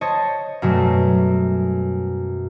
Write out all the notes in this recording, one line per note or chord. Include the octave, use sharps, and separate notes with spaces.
C5 C#5 D#5 A5
F#2 B2 F#3 G3 A3